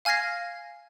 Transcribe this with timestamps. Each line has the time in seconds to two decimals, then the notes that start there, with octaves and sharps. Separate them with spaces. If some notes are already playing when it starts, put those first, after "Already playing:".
0.05 F5 G#5 F6 G#6 A#6 C7